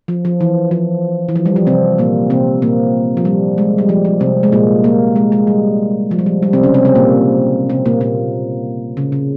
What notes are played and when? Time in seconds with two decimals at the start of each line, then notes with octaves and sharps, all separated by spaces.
0.08 F3
0.25 F3
0.41 E3
0.71 F3
1.29 E3
1.36 F3
1.46 G3
1.56 F3
1.67 C3 C4
1.98 A#2 A#3
2.30 C3 C4
2.62 A#2 A#3
3.17 F3
3.25 G3
3.58 G#3
3.78 G3
3.89 F3
4.05 F3
4.20 C3 C4
4.43 G#3
4.52 A#2 A#3
4.84 A#2 A#3
5.16 G#3
5.32 G#3
5.47 G3
6.11 F3
6.19 G3
6.26 F3
6.43 G3
6.53 C3 C4
6.63 C#3 C#4
6.74 C3 C4
6.85 C3 C4
6.95 A#2 A#3
7.70 C3 C4
7.86 A#2 A#3
8.01 A#2 A#3
8.97 C#3
9.12 C#3